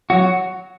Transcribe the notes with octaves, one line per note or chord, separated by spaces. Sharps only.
F#3 F#4